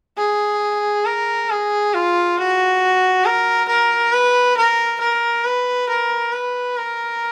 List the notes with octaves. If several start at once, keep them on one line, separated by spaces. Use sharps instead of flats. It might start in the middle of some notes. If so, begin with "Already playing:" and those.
G#4
A#4
G#4
F4
F#4
A#4
A#4
B4
A#4
A#4
B4
A#4
B4
A#4